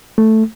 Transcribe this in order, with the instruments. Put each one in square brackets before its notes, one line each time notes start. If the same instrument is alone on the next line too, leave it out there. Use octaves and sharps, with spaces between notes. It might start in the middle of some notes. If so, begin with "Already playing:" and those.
[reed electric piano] A3